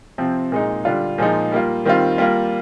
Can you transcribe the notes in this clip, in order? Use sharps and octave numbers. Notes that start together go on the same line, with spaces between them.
C3 F3 C4
A#2 G#3 D#4
D3 G3 D4 F4
A#2 F3 G#3 D#4
G3 A#3 F4
D#3 G3 C4 F4
G3 A#3 F4